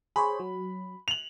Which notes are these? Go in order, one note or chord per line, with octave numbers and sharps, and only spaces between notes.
G#4 C5 C#5 B5
F#3
F7 F#7